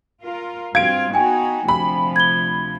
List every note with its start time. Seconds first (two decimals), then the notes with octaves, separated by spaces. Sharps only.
0.22 F4 A#4
0.75 G2 C4 F4 F5 G#6 D7
1.14 B3 D#4 F#4 G5 G#5
1.69 D2 C3 F3 B5
2.16 G#6 G7